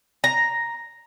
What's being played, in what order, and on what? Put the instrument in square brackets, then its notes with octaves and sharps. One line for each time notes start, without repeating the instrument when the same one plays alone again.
[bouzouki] A#5